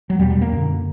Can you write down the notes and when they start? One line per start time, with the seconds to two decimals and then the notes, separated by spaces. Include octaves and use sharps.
0.10 F#3
0.19 E2 G3
0.23 B2
0.30 G3
0.41 A#3
0.52 F#2 D3